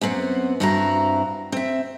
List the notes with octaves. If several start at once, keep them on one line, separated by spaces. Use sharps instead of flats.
F#2 B3 C4 F#5
G2 C4 E4 F#4 A4 A#5
C4 E5